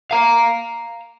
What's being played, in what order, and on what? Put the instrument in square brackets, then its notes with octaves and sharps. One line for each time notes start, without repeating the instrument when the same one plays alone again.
[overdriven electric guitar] F5 A#5